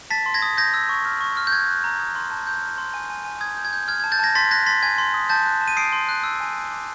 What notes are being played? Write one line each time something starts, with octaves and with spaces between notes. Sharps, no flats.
A5 A6 B6
C6
G#6 A#6
D#6
G6 G#6 A#6
E6
C#6
F6
C#6
F6
G6
F#6 G#6
F#6
A#5
D#6 G#6
C6
A5
C6 G6
F6
C6
G#5
G#5
G#5
D#6 G#6
G6
G#6
G6
F6 G#6
G#6
A5
G6 A6
A5 G#6 A#6
C6 A6 B6
F#6 G#6 A#6
C6 A6 B6
G#5 G#6
C6
D#6
A5 G6 A6
F#6
A5
D#7
D#6 C7 D7
C6
F#6
E6
G#5
G#5
D6